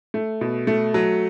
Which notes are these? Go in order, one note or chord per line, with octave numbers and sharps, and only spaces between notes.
A3
B2
A3
F#3